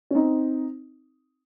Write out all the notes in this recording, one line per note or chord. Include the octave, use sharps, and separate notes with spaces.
C#4
C4 D#4